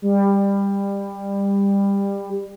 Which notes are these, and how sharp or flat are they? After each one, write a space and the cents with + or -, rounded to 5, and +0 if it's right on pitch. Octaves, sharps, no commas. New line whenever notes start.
G3 +20